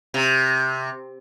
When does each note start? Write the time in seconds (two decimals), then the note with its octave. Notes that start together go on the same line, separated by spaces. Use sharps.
0.14 C3